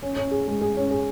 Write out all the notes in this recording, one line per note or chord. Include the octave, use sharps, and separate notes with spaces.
C#4
C#4
G#4
G#3
G#4
C#4
G#4